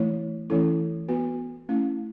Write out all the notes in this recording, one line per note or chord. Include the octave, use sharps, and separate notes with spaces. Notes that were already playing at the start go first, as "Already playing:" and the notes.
Already playing: E3 A3 E4 C#5
E3 A3 C#4 E4 A4
B3 F#4 B4
A3 C#4 E4